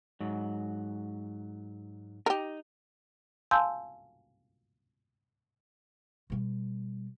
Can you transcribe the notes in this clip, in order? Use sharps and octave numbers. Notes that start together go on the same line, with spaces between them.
G#2 F#3
D#4 G4 A#4
F5 G#5 A5 C6 E6 G6
B2 G3